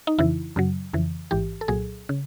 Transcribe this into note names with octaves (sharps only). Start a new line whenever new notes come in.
D#4
F2 C#3 E3 E4
F#2 C#3 F#3
F2 C#3 E3
A1 G#2 E3 G4
A4
C2 A#2 F#3 G#4
C#3